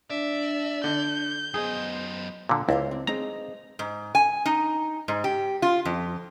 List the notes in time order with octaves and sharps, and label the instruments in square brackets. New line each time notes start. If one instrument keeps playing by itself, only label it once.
[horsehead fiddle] D4 [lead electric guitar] D5 [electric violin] E5
[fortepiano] D3 [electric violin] G6
[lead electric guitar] F#2 D#5 [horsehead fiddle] B3 C5 [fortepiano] G#4
[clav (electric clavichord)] A#2 D3
[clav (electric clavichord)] C#2 [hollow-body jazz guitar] E4 C5 F5
[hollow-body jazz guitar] C4
[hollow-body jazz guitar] G#3 C4 D#4 [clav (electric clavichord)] A#5
[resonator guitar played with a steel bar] G#2
G#5
D#4
G#2
G4
F4
F2